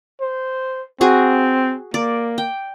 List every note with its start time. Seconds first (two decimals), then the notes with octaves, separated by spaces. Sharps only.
0.21 C5
1.01 C4 F#4 G#4 G#5
1.94 A#3 D5
2.38 G5